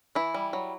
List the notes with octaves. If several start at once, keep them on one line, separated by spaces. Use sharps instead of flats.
E3 E4
G3
F#3